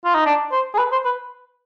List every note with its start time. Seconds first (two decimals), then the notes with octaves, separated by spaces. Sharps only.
0.05 F4
0.14 D#4
0.26 D4
0.52 C5
0.74 G#4
0.78 B4
0.92 C5
1.05 B4